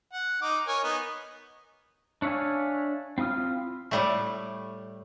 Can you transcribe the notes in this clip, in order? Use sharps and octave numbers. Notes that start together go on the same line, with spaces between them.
F#5
D#4 D6
A#4 C#5 G#5
B3 D#4
D4 C#5 E5 F5 G#5
C4 E4 F4 D#6 F6
A2 G3 A3